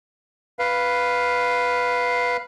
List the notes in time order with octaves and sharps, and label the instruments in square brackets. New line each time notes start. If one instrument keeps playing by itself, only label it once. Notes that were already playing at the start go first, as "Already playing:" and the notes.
[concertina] B4 F5